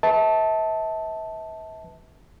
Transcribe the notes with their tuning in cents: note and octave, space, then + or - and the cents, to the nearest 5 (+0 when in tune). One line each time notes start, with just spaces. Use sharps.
B4 +0 E5 -40 A5 +0